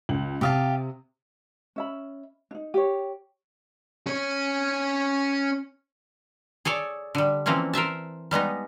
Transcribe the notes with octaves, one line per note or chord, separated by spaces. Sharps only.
C#2 F#7
C3 G4 F5 A5 D#6
C#4 E5 B5
D4 D#4
G4 C#5
C#4 C#5
G#4 A4 C#5 D5
D3 G3
E3 F3 A#3 C4 C#4
A#4 C5 E5 A5
G3 G#3 B3 D#4